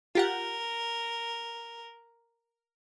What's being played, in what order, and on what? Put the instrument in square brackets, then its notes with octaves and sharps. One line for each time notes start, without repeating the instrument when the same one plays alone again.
[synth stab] F4 G4 F#5 [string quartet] A#4